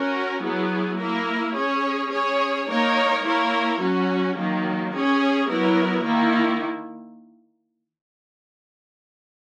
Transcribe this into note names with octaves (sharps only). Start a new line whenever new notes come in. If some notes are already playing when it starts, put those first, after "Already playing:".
Already playing: C#4 F#4 A#4
F#3 B3 E4 G#4
A#3 E4 A#4
C#4 G#4 C#5
C#4 G#4 C#5
A#3 D#4 A#4 C#5
A#3 E4 A#4 C#5
F#3 C#4 F#4
D#3 F#3 A#3
C#4 G#4 C#5
F#3 B3 E4 A#4
D#3 A#3 E4